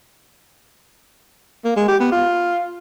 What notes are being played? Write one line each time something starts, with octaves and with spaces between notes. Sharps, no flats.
A#3
G#3
G4
B3
F4